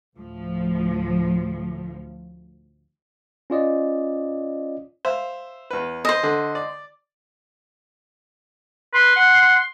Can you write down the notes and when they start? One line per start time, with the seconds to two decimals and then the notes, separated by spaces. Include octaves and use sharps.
0.17 D2 A2 F3
3.50 C#4 F4 D5 D#5
5.05 C5 E5 F5
5.70 E2 B4
6.05 C5 D#5
6.23 D3
6.55 D5
8.93 B4 C6
9.16 F#5